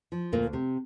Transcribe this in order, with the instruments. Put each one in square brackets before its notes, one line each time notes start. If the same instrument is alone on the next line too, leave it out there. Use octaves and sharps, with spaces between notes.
[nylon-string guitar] F3
D2 A#2 A#3
C3